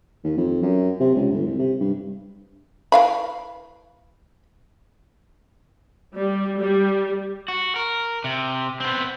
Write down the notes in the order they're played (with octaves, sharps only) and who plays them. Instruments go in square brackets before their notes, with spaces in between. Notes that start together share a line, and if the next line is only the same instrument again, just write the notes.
[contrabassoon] D#2
F2
F#2
C3
C#2
G1
C2
C3
G2
[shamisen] E3 F5 B5
[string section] G3
G3
[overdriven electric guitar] F#4
A#4
C3
B3 C4